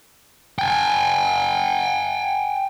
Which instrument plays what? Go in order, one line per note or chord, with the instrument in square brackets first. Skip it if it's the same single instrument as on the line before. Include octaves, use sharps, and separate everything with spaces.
[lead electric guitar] G5 G#5